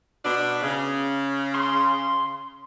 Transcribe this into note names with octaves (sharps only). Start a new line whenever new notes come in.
B2 D4
C#3
C6